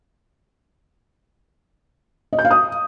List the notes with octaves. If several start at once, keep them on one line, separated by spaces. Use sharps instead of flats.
D#5
G6
F5
D#6